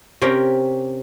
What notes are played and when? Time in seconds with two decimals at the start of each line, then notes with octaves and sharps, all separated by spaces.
0.22 C3 C#4 G4 A#4